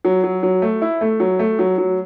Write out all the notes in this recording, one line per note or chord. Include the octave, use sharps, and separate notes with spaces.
F#3
F#3
F#3
A3
E4
A3
F#3
A3
F#3
F#3